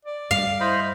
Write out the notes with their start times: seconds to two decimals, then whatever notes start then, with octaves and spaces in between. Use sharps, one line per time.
0.05 D5
0.31 G2 F5
0.60 E4 C5 D#5 B5